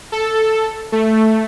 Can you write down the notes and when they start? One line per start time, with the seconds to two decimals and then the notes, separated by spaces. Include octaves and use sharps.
0.12 A4
0.92 A3